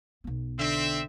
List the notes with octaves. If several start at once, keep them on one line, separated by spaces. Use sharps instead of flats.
B1 B3
D3 C4 E5